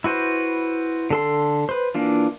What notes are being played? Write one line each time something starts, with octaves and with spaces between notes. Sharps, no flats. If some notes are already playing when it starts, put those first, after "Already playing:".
E4 F#4 B4 C5
D3 A4 C6
B4 C5
E3 A#3 D4 F4